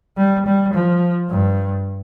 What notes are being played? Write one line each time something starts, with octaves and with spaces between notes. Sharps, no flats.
G3
G3
F3
G2